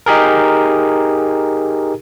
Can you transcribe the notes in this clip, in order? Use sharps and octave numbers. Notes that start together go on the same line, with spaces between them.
D#4 G4 G#4 A#4